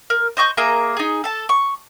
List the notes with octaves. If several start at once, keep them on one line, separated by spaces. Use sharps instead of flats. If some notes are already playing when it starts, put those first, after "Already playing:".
A#4
C5 D#5 C#6 G6
A#3 G#4 E5 A#5
D#4 G#4
A4 A5
C#6